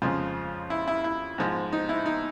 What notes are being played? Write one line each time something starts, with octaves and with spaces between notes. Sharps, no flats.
F2 C#3 F3 G#3 F4
E4
E4
E4
G#2 F3 G#3
D#4
E4
D#4